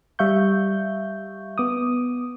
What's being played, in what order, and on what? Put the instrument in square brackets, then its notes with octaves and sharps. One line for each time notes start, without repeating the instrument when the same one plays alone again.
[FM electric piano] G3 E5 F5 C#6 G6
B3 D6 D#6